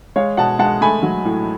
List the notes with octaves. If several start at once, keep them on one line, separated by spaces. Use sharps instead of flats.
G#3 C#5 F5
B2 F#5 A5
G#3 F#5 A5
A3 G#5 B5
F#3
A2